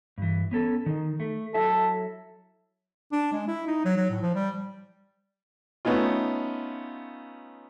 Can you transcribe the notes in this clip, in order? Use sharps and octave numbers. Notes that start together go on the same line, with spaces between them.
G2 E3
B3 C#4 A4
D#3 D#4
A3
F#3 E4 A4 E5
D4
G#3
E4
D#4
F#3
F#3
A2
F3
G3
A3 B3 C#4 D#4 F4